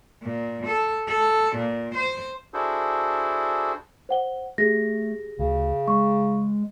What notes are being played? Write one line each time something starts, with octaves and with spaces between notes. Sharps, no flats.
A#2
A4
A4
A#2
C5
D4 E4 F#4 G#4 A4 C5
C5 F#5 G7
A3 G4 G#4 A#6
D2 C#3
G#3 C#6